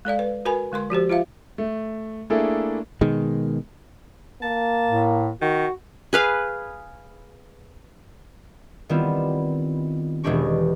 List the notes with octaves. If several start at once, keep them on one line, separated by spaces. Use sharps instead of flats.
G#3 A4 D5 F5
B4
F#4 A#4 B4 G#5 B5
D3 G#3 A#4 C6
F3 F#4 G4 C5
F4 C5 E5 F5
A3
A3 A#3 D4 E4 G#4 A4
B2 D#3 G#3
A#3 A5
A2
D#3 F#4
G#4 B4 F5
D#3 G3 B3 C4 E4 F4
E1 E3 G#3 D4 G4 C#6